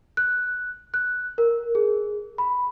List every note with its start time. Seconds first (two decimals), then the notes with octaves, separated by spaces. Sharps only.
0.17 F#6
0.94 F#6
1.38 A#4
1.75 G#4
2.38 B5